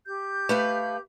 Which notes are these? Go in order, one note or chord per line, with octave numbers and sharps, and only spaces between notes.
G4 G6
A3 B4 F5